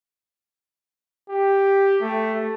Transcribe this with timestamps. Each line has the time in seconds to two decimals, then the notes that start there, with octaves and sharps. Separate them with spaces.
1.29 G4
2.01 A3